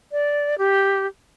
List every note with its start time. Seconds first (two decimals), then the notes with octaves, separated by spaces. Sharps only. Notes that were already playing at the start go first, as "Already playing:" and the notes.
0.12 D5
0.58 G4